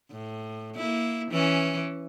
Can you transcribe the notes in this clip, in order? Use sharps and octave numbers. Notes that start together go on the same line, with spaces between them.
A2
A#3 E4
E3 C#4